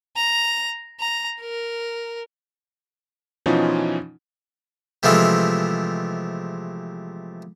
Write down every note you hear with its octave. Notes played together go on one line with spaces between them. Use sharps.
A#5
A#5
A#4
B2 E3 F3 C#4 D#4 F4
C3 E3 F3 G#3 A3 F4